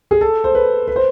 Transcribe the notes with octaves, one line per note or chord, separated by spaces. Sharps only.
G#4
A4
C5
B4
B4
C5